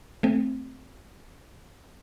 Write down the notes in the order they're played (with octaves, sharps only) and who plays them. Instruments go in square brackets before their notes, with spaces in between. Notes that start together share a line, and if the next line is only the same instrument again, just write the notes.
[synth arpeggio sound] A3 C4